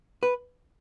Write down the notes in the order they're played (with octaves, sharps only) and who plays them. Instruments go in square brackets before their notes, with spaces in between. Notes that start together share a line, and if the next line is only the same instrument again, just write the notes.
[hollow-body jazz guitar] B4